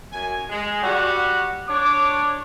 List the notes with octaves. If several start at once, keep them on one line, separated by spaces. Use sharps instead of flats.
F#2 G#5
G#3
G3 F#4 F#5
D4 C#5 D6